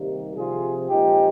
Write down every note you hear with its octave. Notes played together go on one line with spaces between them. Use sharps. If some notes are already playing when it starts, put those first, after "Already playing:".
Already playing: C3 D#3 G3 A#3
C3 F3 C4 F4 G#4
A#2 F3 G#3 C4 D#4 G4